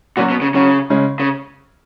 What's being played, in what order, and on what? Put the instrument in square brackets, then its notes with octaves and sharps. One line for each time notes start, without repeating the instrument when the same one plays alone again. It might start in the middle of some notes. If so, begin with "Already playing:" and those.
[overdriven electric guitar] A#2 [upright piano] F#3 C#4 F#4
[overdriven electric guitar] B2
C#3
[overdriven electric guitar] C#3 [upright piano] F#3 C#4 F#4
[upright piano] C#3 G#3 C#4
[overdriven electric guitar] C#3